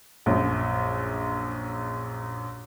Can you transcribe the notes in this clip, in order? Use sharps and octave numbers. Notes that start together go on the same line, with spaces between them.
A#1 F#2